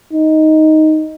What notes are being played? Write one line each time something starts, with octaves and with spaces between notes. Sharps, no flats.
D#4